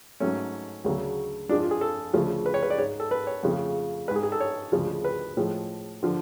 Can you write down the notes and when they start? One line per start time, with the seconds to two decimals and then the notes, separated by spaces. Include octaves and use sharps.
0.20 G#2 F#3 A3 C#4
0.84 D2 C#3 F#3 A3
1.49 F2 F3 G#3 D4
1.60 F4
1.71 G#4
1.81 A4
2.13 D2 C#3 F3 A3
2.46 B4
2.54 C#5
2.63 B4
2.70 D5
2.78 G#2 G#3 C#5
3.00 A4
3.11 B4
3.27 C#5
3.43 F2 C#3 F3 A3
4.08 G#3 B4
4.11 G#2 G#4
4.23 G#4
4.32 A4
4.40 C#5
4.72 D2 C#3 F3 G#3
5.05 B4
5.37 A2 F3 G#3
6.03 D3 F3